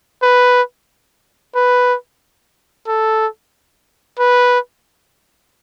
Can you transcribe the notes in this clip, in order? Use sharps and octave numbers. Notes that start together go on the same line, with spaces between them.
B4
B4
A4
B4